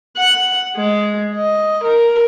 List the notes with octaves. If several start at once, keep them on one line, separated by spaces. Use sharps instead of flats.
F#5
G#3
D#5
A#4